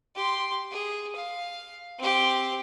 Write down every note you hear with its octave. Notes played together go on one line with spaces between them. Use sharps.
G4 C6
G#4
F5
C4 G4